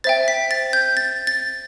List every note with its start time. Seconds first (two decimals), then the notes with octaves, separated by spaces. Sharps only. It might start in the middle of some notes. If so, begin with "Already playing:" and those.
0.04 C5 E5 G5 A6
0.28 B6
0.51 A6
0.73 G6
0.97 A6
1.27 A6